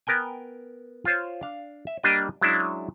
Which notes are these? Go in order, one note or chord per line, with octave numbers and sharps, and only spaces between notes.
B3 A#4 G5 G#5
F4 C5 C#5
D4 F5
E5
G3 A#3 D4 G4 D#5
F#3 G#3 C#4 D4 E4